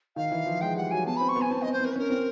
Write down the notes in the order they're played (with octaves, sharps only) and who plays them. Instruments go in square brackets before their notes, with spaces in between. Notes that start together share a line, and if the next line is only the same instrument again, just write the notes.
[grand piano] D#3 [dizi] F5
[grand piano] E3
F3
[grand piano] G#3 [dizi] G5
[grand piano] G3 [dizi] F#5
[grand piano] F#3 [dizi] G#5
[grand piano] B3 [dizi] A5
[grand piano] C4 [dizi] B5
[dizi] C#6
[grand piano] B3
[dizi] G#5
[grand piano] C4 [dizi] A5
[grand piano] C4 [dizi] D#5
[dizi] C5
[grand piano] C4 [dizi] A#4
[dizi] B4
[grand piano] C#4 [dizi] A#4
[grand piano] C4